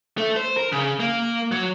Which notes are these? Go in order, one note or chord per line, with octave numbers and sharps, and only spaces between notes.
A3
C5
A#4
C#3
A#3
F#3